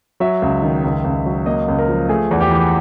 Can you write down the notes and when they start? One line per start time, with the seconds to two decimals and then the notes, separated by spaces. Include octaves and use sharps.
0.20 F#3 E5
0.42 C#2
0.63 D#3
0.84 C#2
1.04 C#2
1.26 F#3
1.46 A#3 D#5
1.68 C#2
1.79 A#4
1.88 F3
2.09 A3 G#4
2.31 E2
2.40 G4
2.51 E3